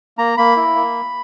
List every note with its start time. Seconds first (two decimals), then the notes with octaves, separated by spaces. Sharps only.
0.18 A#3 A#5
0.37 A#3 B5
0.57 E4
0.75 A#3